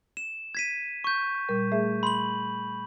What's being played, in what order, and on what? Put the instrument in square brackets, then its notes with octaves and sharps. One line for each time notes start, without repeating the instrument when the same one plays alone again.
[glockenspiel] E7
G#6 B6 D#7
C#6 G6
[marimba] A#2 G3 A#4
A3 G#4 E5
[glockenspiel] B5 F#7 [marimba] C6